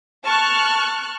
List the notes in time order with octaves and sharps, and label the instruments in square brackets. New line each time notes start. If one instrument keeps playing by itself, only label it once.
[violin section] A5 C#6 F6 F#6